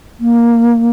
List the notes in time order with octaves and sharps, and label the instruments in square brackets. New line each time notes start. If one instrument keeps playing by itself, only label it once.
[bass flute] A#3